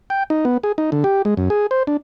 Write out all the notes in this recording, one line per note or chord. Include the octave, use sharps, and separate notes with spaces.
G5
D#4
B3
G#4
D#4
D3
G4
G#3
F#2
G#4
C5
D4